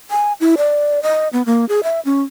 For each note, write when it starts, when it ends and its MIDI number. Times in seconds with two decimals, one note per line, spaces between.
0.11 0.33 80
0.41 0.55 64
0.57 1.02 74
1.03 1.28 75
1.33 1.42 59
1.46 1.65 58
1.69 1.81 68
1.83 2.00 76
2.05 2.22 61